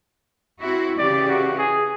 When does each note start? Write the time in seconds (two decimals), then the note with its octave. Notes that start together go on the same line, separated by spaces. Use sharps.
0.60 C4 E4 F#4
0.98 C#3 E3 G4 D5
1.28 F#4
1.58 G#4